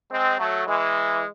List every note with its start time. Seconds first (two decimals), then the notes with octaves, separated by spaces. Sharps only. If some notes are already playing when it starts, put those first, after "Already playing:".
0.10 G#3 C4
0.38 F#3 A3
0.66 E3 G#3